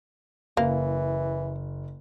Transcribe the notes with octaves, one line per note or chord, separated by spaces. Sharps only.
F#1 E3 A#3